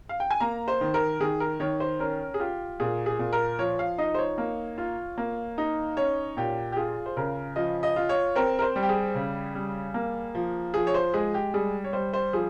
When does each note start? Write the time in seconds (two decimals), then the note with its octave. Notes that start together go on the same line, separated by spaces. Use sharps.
0.09 F5
0.20 G5
0.31 G#5
0.40 A#3 A#5
0.68 C5
0.81 D#3
0.94 A#4
1.20 D#3 G#4
1.40 A#4
1.60 D#3 C#5
1.80 C5
1.99 C#4 A#4
2.34 G#4
2.40 F4 G4
2.80 A#2 G#4
3.06 G#4
3.19 A#2
3.33 A#4
3.59 F3 C#5
3.79 F5
3.98 D#4 D#5
4.14 C5
4.18 C#5
4.38 A#3
4.78 F4
5.18 A#3
5.58 D#4
5.97 C#4 C#5
6.37 A#2 G4
6.72 G4
6.77 F4 G#4
7.06 C5
7.17 C#3 A#4
7.56 F3 D#5
7.83 D#5
7.96 F4
8.09 C#5
8.36 C4 A#4
8.59 A#4
8.62 C5
8.76 G3
8.83 G4
8.89 G#4
9.15 C#3
9.55 G3
9.94 A#3
10.35 F3
10.74 F3 G#4
10.87 C#5
10.94 C5
11.14 G#3 G#4
11.34 G4
11.54 G3 G#4
11.84 C#5
11.93 G3 C5
12.13 C5
12.33 F3 G#4